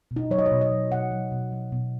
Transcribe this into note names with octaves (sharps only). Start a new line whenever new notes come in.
B2
D#4
F#3 C#5
D#5
C#5
B2
D#5
F#3
B2 F#5
F#3
B2
F#3
B2